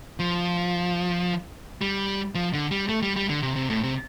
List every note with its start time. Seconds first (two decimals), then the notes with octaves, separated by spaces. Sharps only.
0.19 F3
1.81 G3
2.35 F3
2.53 D3
2.71 G3
2.89 A3
3.02 G3
3.16 G3
3.29 D3
3.43 C3
3.56 C3
3.70 A2
3.83 C3